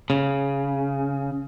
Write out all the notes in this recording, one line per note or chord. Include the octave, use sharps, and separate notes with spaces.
C#3